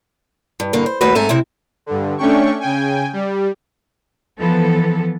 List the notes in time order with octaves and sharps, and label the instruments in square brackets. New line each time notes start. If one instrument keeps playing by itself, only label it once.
[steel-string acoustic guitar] G2
G2 D3 A#3
C5
D#2 G3 A3 F#4 B4
G#2 C4 A4 E5 G#5 A#5
C3 C4 E4
[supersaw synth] G2 D3
A3 C#4 D4 G5 C#6
C#3 G5 G#5
G3
[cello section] E3 F3 B3 A4